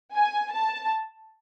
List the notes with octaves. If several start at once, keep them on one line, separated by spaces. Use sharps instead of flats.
G#5
A5